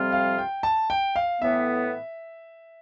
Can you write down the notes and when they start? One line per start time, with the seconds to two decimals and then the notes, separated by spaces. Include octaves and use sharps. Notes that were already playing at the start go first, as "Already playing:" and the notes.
Already playing: F2 C3 G3 C4 F4
0.12 F5
0.38 G5
0.63 A5
0.90 G5
1.16 F5
1.41 A2 E3 B3 E5